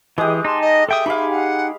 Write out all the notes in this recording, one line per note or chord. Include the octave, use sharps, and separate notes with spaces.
E3 G#3 G4 G#4 D#6
D#4 A5 C6
D#5
A4 E5 G5 D#6
D#4 G4 G#4 F5 B5
F#5